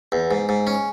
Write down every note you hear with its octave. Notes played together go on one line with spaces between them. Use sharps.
E2
G#2
G#2
C#4